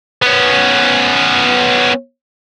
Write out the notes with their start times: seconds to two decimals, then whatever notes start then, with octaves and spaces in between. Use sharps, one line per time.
0.22 B3 C#4